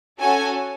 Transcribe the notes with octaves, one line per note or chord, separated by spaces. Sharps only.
C#4 F#4 A4 G#5